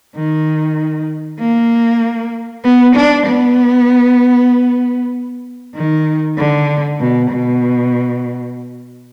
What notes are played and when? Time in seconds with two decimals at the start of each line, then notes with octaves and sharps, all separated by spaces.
0.16 D#3
1.40 A#3
2.64 B3
2.95 D4
3.27 B3
5.75 D#3
6.38 D3
7.00 B2
7.30 B2